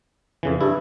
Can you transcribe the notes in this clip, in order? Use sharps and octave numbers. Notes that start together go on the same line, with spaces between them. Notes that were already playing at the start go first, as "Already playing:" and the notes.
F2 C#3 E3
G2 E4